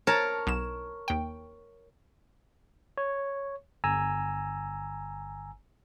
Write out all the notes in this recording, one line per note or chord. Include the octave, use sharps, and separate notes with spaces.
A#4 C#5 A5
B1 E7
D#2 G5
C#5
G1 G#5 A#5 E6